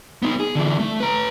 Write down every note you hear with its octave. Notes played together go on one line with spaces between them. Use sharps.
B3 D#4
G#4
D3 E3
A3
B4 A#5